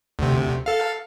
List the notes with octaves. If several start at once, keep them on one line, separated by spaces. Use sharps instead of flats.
D2 C3
A4 F5